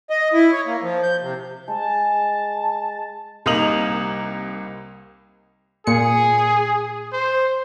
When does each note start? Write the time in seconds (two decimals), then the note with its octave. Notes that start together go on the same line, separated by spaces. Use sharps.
0.10 D#5
0.33 E4
0.51 C#5
0.66 A#3
0.83 F3
1.03 G6
1.21 C3
1.68 G#3 A5
3.46 C2 A#3 D#4 D#6 F7 F#7
5.87 A#2 G#4 C#7
7.13 C5